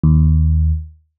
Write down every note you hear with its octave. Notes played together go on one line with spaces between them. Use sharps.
D#2